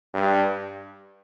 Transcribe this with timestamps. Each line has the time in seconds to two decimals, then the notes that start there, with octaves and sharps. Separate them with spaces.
0.13 G2